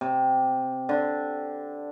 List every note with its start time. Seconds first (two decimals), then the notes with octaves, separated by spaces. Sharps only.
0.01 C3
0.89 D3